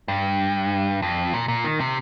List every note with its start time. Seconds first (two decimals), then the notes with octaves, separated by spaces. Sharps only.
0.08 G2
1.02 F2
1.33 A#2
1.48 A#2
1.64 D#3
1.80 C3